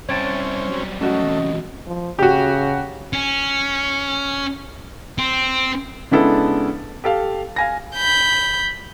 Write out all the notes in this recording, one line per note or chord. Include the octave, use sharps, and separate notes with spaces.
G3 C4 C#4 E4 C#5 G5 A5
F#3 G3
A3 C#4 F#4 D#5
E2 C3
F3
C#3 F#4 G4
C#4
C4
C#3 G#3 B3 D4 E4 A4
G4 A4 F5
F5 G#5 A#6
B5 G6